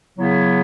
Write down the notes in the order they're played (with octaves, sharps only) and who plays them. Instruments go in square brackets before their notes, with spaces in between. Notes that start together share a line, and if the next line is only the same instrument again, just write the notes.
[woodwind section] C#3 F#3 B3 E4